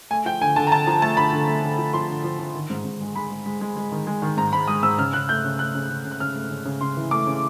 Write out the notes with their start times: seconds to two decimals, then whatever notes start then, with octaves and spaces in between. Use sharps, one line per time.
0.11 A3 G#5
0.26 F3 G5
0.41 D3 G#5
0.56 D3 A5
0.67 A#5
0.72 D3 A5
0.87 F3 A#5
1.02 A3 A5
1.17 D3 B5
1.33 D3
1.48 A3
1.63 D3
1.78 F3
1.93 F3 C6
2.09 D3
2.24 F3
2.39 F3
2.54 D#3
2.70 G#2
2.85 G#2
3.01 G#3
3.16 G#3 B5
3.31 G#3
3.46 G#3
3.61 G#3
3.76 G#3
3.92 D#3
4.07 G#3
4.22 D#3
4.37 G#2 A#5
4.53 G#2 B5
4.68 G#3 D#6
4.83 G#2 E6
4.98 C#3 F6
5.13 C#3 F#6
5.29 A3 G6
5.44 C#3
5.59 A3 F#6
5.75 C#3
5.90 C#3
6.05 C#3
6.11 F#6
6.20 C#3 F6
6.35 A3
6.51 C#3
6.65 C#3
6.81 C#3 C6
6.97 E3
7.11 A3 D6
7.27 C#3